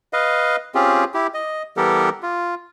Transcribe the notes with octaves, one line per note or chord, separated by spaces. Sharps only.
B4 D#5 F5
C4 C#4 F4 G4 G#4
E4 G4
D#5
E3 G3 B3 G4 A4 A#4
F4